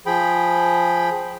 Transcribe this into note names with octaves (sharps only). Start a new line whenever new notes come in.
F3 G#4 G5 B5